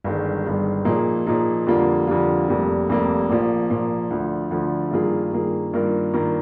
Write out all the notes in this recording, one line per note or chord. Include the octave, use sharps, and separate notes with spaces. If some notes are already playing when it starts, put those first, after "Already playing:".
G1 G2 D#3 G#3
G1 G2 D#3 G#3
A#2 F3 A#3 D#4 G#4
A#2 F3 A#3 D#4 G#4
F2 D3 G3 A#3 F4
F2 D3 G3 A#3 F4
F1 F2 C3 G3 A#3
F1 F2 C3 G3 A#3
A#1 A#2 F3 A#3
A#1 A#2 F3 A#3
D2 D3 F3
D2 D3 F3
G2 D#3 A#3 F4 G#4
G2 D#3 A#3 F4 G#4
G2 D#3 A#3 F4 A#4
G2 D#3 A#3 F4 A#4